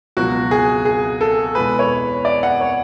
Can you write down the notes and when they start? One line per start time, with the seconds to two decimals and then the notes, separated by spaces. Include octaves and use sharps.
0.17 C#2 B2 F#3 F#4
0.51 G#4
0.85 G#4
1.21 A4
1.55 E2 B2 G#3 B4
1.79 C#5
2.25 D5
2.43 F#5
2.61 C#5